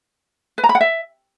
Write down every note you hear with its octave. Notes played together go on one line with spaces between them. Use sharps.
B4
A#5
B5
F#5
E5